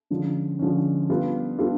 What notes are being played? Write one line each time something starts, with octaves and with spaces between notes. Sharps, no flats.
D3 F3 G#3 C#4
D3 F3 G#3 C#4
G3 B3 D4 F4 A4
G3 B3 D4 F4 A4